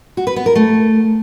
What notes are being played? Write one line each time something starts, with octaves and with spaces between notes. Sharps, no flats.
F#4
B4
B3
A#4
A3